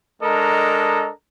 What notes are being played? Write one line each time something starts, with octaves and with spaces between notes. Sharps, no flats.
G#3 D4 A4 A#4 D#5 A#5